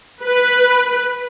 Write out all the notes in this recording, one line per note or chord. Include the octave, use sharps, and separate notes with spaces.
B4